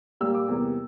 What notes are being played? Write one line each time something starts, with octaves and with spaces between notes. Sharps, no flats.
A#2 G3 A#3 E6
D6
E2 C3 G3 A#3